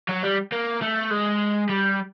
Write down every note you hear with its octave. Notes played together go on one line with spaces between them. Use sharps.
F#3
G3
A#3
A3
G#3
G3